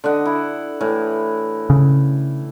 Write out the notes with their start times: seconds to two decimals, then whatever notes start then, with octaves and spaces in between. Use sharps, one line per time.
0.04 D3 D#5 F#5
0.25 E4
0.81 A2 E3
1.70 C#3